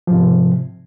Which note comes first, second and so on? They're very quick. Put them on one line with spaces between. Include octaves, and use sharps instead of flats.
F3 G#2 C3